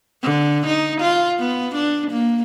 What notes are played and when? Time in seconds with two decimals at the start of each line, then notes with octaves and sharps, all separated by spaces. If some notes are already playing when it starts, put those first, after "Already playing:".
0.23 D3
0.66 D#4
1.01 F4
1.40 B3
1.75 D4
2.10 A#3